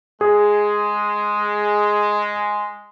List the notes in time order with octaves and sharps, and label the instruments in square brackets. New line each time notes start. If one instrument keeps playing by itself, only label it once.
[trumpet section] G#3 [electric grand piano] G#4